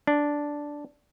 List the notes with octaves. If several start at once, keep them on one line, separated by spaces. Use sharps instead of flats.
D4